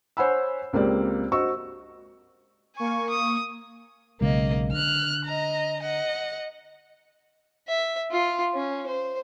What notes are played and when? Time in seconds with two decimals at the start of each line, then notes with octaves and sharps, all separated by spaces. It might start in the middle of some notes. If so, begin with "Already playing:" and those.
0.17 C5 C#5 F#5 G#5 B5 E6
0.73 C#2 A#3 C4 G4 D5
1.32 F#4 C5 D#5 C#6 E6
2.77 A#3 G#5 C#6
3.09 D#6
4.21 B1 C#3 G#3 A#3 D#5
4.73 D3 F6 F#6
5.25 D#5 A#5
5.81 D#5 F#5
7.68 E5
8.11 F4
8.54 C#4
8.86 C5